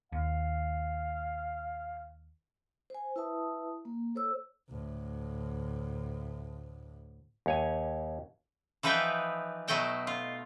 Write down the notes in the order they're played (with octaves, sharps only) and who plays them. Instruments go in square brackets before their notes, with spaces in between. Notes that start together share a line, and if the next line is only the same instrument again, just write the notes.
[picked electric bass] D#2 [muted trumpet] F5
[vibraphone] C5 G#5
E4 B4 E5 A5 D#6
A#3
A4 C5 C#5 E6
[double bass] D2 A2
[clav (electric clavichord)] D#2 C#5 G#5
[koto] E3 F3 D#4 B4 E5 G5
B2 F#3 A3 D#5 G5 A5
F4